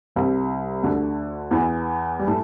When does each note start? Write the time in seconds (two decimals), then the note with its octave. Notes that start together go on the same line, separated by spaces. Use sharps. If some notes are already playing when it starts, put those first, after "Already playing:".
0.16 C2 C3
0.83 D2 D3
1.51 E2 E3
2.19 G3
2.28 A2 A3